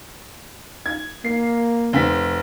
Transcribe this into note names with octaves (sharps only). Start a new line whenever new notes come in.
G#6
A#3 C7
F1 C4 B6